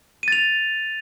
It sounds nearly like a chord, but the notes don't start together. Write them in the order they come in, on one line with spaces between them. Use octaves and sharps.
D#7 A6 F7